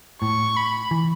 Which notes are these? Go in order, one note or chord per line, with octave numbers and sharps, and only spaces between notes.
A2 C#6
B5
E3